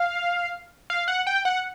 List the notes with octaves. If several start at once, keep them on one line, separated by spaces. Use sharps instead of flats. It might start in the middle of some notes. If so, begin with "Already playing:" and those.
Already playing: F5
F5
F#5
G5
F#5